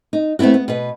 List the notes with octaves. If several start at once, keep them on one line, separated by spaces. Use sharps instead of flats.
D#4
A3 B3 C4 E4 F#4
B3
B2 B4